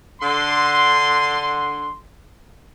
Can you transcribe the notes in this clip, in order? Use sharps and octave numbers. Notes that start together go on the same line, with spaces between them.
D3 C6